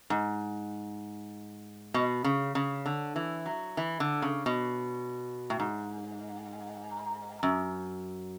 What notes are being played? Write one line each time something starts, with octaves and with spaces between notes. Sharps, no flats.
G#2
B2
C#3
C#3
D3
E3
F#3
E3
D3
C#3
B2
A2
G#2
F#2